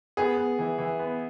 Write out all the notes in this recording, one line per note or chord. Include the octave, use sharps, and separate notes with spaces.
B3 G#4
B3
E3
E3
B3